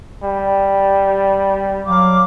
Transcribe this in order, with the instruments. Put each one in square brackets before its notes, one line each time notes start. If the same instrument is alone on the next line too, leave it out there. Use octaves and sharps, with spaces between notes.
[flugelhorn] G3
[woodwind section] F#3 F5 D6